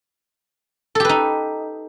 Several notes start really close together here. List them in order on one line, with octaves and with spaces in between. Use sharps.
A4 G4 B4 D#4